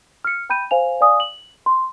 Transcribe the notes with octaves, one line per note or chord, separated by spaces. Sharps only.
F6 C#7
G5 B5 G6 D#7
C5 F5 G#5 F7
D5 F5 G#5 D#6
F#7
C6